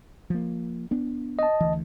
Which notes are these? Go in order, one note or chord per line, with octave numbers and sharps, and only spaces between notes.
F3 A#3
B3 D4
D#5 A5
D2 E3